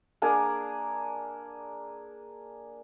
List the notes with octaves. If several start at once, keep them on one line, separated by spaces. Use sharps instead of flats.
A#3 D4 G#4 A#4